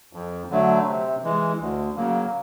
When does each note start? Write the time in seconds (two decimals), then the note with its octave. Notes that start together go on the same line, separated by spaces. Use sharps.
0.13 F2
0.50 D3 F#3 A3
0.86 C3
1.23 E3 G#3
1.60 D2
1.97 C#3 F#3 A#3